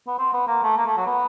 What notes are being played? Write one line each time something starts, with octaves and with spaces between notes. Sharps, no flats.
B3
C4
B3
A#3
A3
A#3
A3
F#3
B3